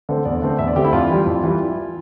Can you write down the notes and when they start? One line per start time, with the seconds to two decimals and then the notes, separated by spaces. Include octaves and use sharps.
0.09 D3 A3 C4
0.25 E2 D5
0.42 D3 A3 C4
0.58 E2 E5
0.67 D5
0.76 D3 A3 C4 G4
0.84 E4
0.92 F2 F4
1.09 E3 G3
1.26 F2
1.44 E3 G3